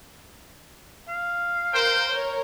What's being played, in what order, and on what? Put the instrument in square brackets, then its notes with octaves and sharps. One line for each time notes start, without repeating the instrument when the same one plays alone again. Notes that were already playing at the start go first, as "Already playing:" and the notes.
[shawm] F5
[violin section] A#4 C6 [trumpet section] C5 G5
[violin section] A#4 C#5